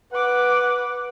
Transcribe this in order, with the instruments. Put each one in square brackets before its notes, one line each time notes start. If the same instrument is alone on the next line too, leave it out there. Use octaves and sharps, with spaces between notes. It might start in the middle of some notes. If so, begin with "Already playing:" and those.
[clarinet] B4 [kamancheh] F#5 D6